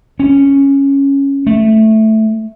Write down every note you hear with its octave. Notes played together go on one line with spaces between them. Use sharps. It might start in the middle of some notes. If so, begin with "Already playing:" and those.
C#4
A3